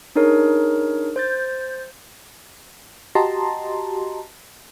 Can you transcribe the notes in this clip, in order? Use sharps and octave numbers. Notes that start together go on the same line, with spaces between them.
D4 D#4 G#4 A#4 C#5
C5 G6 A6
F#4 G4 D#5 A5 A#5 C6